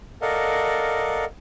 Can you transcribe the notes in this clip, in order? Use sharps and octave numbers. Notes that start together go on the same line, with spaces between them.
A4 A#4 D5 D#5 F5 F#5